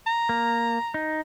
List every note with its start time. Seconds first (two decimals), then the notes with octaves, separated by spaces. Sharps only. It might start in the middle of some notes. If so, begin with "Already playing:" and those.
0.07 A#5
0.29 A#3
0.94 D#4